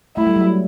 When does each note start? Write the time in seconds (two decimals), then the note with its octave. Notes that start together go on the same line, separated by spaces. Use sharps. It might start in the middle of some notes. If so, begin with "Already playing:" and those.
0.17 A3 E4
0.27 G3
0.36 F#3